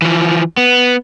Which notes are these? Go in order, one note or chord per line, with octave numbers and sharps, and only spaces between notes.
E3 F3
B3